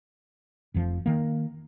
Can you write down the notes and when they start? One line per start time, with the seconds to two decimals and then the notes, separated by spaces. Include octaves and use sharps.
0.74 F1 F2 F3
1.06 D#3 A#3